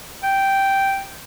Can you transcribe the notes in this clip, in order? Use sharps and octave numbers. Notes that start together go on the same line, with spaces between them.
G5